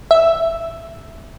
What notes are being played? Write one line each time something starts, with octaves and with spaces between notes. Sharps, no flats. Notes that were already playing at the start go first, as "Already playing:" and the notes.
E5